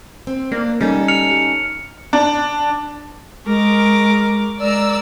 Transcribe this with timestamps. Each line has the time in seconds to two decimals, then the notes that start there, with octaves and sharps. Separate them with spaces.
0.27 C4
0.52 A#3 D4
0.81 G3 C#4 D#4 A4
1.08 F6 C#7 F7
2.13 D4
3.46 G#3 A#4 C#6 D6
4.60 G#3 A#4 D5 E6